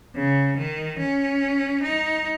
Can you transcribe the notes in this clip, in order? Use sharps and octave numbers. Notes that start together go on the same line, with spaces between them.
C#3
D#3
C#4
D#4